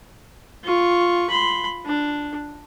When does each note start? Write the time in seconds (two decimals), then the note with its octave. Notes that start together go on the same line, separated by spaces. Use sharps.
0.64 F4 C#6
1.30 B5 C6
1.86 D4